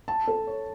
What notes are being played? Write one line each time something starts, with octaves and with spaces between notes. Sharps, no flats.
A5
A4
C#5